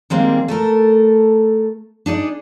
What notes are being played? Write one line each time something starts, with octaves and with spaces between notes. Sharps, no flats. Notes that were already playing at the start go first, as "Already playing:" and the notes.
D#3 G3 G#3 A#3 C4 G#4
A3 A4 A#4
D4 D#4 G#4 D5